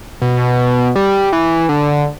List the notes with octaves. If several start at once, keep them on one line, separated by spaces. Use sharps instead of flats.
B2
G3
E3
D3